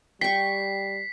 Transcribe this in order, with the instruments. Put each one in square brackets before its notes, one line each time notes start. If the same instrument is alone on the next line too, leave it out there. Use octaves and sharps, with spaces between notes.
[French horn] G3 [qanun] G5 C#6 [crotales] B6 C7